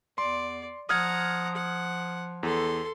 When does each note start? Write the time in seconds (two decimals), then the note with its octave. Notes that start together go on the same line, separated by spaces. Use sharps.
0.18 E2 D5 C6
0.89 F3 F#5 A#5 D#6 F6 G#6
1.56 F#5
2.43 E2 A4 C6